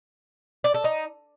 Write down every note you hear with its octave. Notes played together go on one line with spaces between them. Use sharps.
D5
A4
D#4